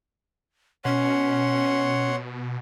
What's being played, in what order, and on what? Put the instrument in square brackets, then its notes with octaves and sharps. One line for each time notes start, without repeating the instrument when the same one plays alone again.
[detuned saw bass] B2 [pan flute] C#4 [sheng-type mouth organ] C#5 F#5 C6